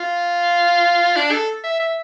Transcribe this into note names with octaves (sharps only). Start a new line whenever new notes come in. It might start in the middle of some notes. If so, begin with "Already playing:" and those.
Already playing: F4
D4
A4
E5
E5